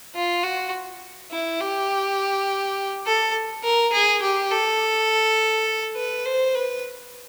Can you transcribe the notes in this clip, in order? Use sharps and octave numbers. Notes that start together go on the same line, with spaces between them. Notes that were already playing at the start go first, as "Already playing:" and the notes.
F4
F#4
E4
G4
A4
A#4
G#4
G4
A4
B4
C5
B4